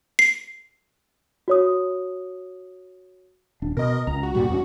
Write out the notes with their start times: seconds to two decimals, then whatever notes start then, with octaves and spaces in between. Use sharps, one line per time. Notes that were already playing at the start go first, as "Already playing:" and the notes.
0.19 C7
1.48 F#4 C#5 D#6
3.62 D#1 D4
3.77 B2 A#4 D#5
4.07 C#2 A#5
4.23 F#4
4.35 G2 A#2 G3 F#4
4.49 E2 B3 C#4